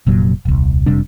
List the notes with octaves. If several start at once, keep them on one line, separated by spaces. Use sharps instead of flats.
F1 A#2 F#3
D#1 C2
F1 C3 G3 D4